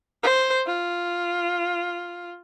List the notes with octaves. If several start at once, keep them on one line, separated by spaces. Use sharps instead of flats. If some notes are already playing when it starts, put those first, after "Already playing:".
C5
F4